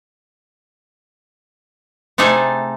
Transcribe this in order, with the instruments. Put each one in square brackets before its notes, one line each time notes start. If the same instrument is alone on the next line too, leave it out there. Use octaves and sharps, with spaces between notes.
[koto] C3 A3 D#4 G#4 A4